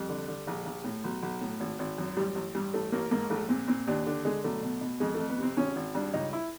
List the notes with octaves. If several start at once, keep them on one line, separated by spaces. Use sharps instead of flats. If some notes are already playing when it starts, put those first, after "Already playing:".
Already playing: F2 G3
D3
D3
A#1
A#1
A2
B1
B1
A2
G#1
G#1
F#2
A1 G3
A1
G2 G3
A1 A3
A1 A#3
G#2 A#3
A#1 A3
A#2 C4
A#2 C4
D#2 D4
D3 D4
D3 G#3
B1 A3
B2
B2
F2 G#3
A3
F2
B3
C3 C4
G#1 C#4
G#1
G2 D4
C#2 D#4
E4